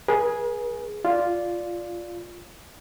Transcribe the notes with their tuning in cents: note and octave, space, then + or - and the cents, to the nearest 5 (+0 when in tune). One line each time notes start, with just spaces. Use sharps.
G#4 +0 B4 -45
F4 +0 D5 +0